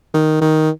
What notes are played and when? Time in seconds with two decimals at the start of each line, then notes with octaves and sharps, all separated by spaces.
0.14 D#3
0.41 D#3